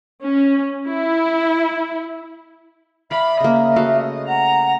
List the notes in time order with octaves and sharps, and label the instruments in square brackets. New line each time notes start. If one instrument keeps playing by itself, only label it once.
[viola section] C#4
E4
[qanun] D5 F5 [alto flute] E5 [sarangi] B5
[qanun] C#3 A#3 [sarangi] D#5
[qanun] A3 F#4 F5
[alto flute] F#5 [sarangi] A#5